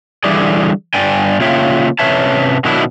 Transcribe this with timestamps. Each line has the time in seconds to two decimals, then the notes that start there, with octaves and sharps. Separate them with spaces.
0.24 D3 E3 G3 G#4 D5
0.94 G2 D5 G5 G#5
1.41 C#3 A#3 F4 C#5 E5 G5
1.99 C3 C#4 B4 C#5 E5 A5
2.65 B2 D#3 F#3 D4 E4